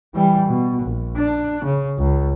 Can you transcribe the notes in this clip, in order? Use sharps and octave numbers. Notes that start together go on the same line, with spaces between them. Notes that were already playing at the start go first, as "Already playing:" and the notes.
E3 G3
B2
A#1
D4
C#3
C#2